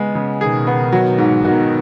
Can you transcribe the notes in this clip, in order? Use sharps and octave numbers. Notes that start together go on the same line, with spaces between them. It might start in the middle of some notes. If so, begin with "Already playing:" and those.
Already playing: C#3 G#3 B3
C#3
B2 D#3 G#4
B3
F#3
G#2
B2 D#3 F#4